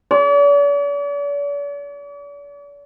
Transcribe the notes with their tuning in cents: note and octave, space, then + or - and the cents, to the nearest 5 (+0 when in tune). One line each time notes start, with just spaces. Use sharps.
D5 -45